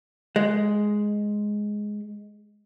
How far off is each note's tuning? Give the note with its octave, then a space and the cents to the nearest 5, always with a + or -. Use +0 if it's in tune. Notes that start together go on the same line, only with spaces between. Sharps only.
G#3 +5